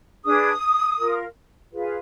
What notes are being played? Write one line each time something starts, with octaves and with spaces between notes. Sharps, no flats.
D4 G#4 B4 D#6
F4 A#4
F4 G#4 B4